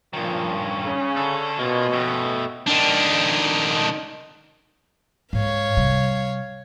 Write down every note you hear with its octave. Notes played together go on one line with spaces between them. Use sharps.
G2 A#2 D#3 F3 C#4
C#3
D4 A4
B2 A#3 F4
A3 G4
D#3 D4
G#2 C#5 F5
C3 G3